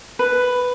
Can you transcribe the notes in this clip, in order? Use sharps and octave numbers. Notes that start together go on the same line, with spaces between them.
B4